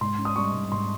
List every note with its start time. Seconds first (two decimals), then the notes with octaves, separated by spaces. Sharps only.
0.01 G#2 C6
0.18 C#4
0.25 D#6
0.36 G3 C#6
0.54 G#2
0.71 G#2 C6